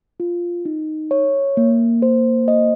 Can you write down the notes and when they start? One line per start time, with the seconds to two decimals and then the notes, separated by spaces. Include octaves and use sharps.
0.20 F4
0.65 D#4
1.11 C#5
1.57 A#3
2.02 C5
2.48 D#5